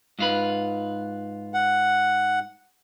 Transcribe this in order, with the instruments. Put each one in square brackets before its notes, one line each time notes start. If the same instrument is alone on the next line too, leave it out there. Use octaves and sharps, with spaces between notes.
[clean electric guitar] G#2 F4 B4
[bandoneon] F#5